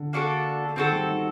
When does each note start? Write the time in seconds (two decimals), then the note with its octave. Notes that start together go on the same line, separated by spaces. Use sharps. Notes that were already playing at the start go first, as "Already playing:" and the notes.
Already playing: D3
0.13 A#3 D4 F#4 A4
0.76 D#3 C4 F#4 A4
0.92 G3
1.08 D#4